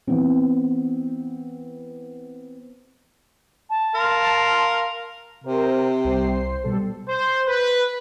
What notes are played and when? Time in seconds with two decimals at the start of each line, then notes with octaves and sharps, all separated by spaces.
0.07 E3 B3 C4
3.70 A5
3.95 A#4 F5 C6
5.44 C3 A#4 C5
6.04 C2 C5 C7
6.64 B2 G3 A4
7.08 C5
7.47 B4